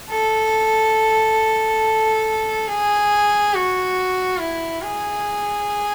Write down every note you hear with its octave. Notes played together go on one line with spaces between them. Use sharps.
A4
G#4
F#4
E4
G#4